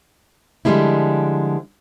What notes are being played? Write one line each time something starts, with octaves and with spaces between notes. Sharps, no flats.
D3 F3 G3 G#3 A#3 E4